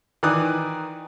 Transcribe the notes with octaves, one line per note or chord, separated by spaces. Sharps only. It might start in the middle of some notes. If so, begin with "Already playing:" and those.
D#3 E3 D5 D#6 F#6